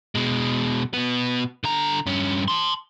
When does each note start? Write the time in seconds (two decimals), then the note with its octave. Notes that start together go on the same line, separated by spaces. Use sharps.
0.15 B2 G#3
0.94 B2 B3
1.64 D3 A#5
2.06 G2 C#4
2.48 A5 C6